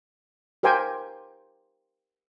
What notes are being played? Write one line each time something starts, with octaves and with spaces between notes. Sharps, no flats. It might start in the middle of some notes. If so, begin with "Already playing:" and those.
G4 A#4 C5 G5 G#5